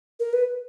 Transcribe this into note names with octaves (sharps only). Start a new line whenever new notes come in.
A#4
B4